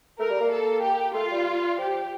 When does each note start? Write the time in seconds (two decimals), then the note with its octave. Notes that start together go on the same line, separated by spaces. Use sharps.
0.19 A3 A#4
0.30 G3
0.40 A#3
0.51 A4
0.82 G4
1.14 A3 F4
1.31 G3
1.78 F3 G4